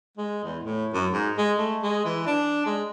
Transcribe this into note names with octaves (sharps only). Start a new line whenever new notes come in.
G#3
E2
A2
F#2
G#2
G#3
A3
G#3
E3
D4
G#3